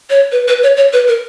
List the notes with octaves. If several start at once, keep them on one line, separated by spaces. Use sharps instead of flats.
C#5
B4
B4
C#5
C#5
B4
A#4